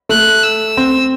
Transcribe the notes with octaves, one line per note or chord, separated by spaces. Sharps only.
A3 F#6
E6
C4